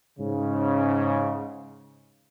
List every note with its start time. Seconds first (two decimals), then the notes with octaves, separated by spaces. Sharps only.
0.19 G#2 C#3